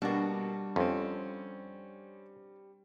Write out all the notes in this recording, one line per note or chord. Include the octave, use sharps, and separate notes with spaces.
B2 G3 A#3 D4 F#4
F2 C4 C#4